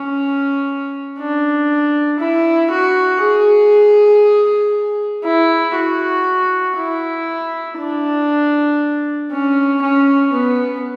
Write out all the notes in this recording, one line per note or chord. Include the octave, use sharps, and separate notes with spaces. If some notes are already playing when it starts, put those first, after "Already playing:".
Already playing: C#4
D4
E4
F#4
G#4
E4
F#4
E4
D4
C#4
C#4
B3